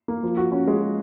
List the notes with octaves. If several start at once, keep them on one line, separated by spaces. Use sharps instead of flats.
A#3
F3
F#4
C#4
G#3